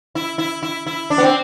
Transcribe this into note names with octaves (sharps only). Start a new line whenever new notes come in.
E4
E4
E4
E4
D4
B3
C4